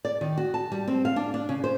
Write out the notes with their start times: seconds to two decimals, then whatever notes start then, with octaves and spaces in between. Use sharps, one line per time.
0.05 D5
0.21 D#3
0.37 F#4
0.54 A5
0.72 G3
0.88 C4
1.05 F5
1.16 D4
1.34 D4
1.49 C#3
1.64 C5